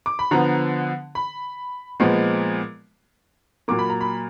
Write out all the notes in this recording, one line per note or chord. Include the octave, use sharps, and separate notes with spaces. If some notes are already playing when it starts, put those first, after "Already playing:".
D6
B5
D3 F3 B3 A#5
B5
A#2 F3 G#3 B3
A#2 F#3 A#3 D6
B5
A#5
B5